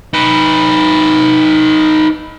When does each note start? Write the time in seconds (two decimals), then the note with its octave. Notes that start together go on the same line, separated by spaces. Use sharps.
0.14 D#4 B4